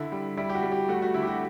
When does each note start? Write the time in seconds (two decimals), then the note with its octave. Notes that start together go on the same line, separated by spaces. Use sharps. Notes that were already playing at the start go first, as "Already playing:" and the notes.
Already playing: D3 E4
0.12 G3
0.37 G3 E4
0.49 G4
0.55 F#4
0.63 G3
0.72 G4
0.89 A3 F#4
1.02 F#4
1.14 D3 E4
1.22 G4
1.27 F#4